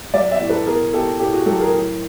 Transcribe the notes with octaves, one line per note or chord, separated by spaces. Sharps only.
F#3 D5 E5
D5 E5
A2
A4 B4
B2 G#4 A#4
B2 G4 A4
A2 G4 A4
F#4 G#4
F#3 G4 A4
G#4 A#4
A2